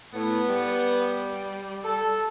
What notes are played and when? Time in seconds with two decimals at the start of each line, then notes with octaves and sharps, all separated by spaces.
0.14 A2 B3
0.49 G3
1.85 A4